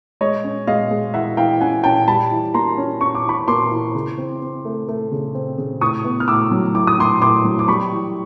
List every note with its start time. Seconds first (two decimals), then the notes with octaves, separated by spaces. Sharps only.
0.21 G#3 C#5 D#5
0.44 C#4
0.67 G#3 D#5 F5
0.91 G#3
1.14 E3 E5 F#5
1.37 E3 F5 G5
1.61 C#4 F#5 G#5
1.84 C#4 G5 A5
2.07 G3 A5 B5
2.31 E3
2.54 A#3 A#5 C6
2.78 C#4
3.01 C#4 C#6
3.15 D6
3.25 E3 B5 C#6
3.48 A#3 C6 D6
3.71 E3
3.95 C#3
4.18 C4
4.41 C4
4.65 A3
4.88 A3
5.12 C#3
5.35 C4
5.58 C#3
5.81 A2 C#6 D#6
6.05 B3
6.20 F6
6.28 A2 D6 E6
6.51 F#3
6.75 A2 D6
6.87 D#6
6.98 A2 C6 D6
7.21 A2 C6 D6
7.45 F#3
7.59 D6
7.68 G3 B5 C#6
7.92 E3